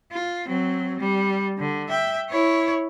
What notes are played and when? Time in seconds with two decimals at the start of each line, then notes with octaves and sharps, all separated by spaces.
0.12 F4
0.47 F#3 C4
0.99 G3
1.58 D3
1.89 E5 G5
2.29 E4 C#5